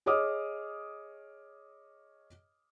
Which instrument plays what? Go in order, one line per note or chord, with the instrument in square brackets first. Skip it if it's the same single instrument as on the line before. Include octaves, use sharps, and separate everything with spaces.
[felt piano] G#4 C#5 D#5 D6 D#6 F6